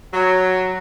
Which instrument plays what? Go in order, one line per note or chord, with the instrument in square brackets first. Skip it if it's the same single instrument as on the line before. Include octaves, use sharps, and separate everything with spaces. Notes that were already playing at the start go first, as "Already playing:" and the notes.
[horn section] F#3